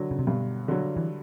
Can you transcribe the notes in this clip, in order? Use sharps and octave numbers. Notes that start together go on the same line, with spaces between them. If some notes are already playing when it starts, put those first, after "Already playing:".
Already playing: D3 F#3
C#3
C3
G2 B2
D3 F#3
E3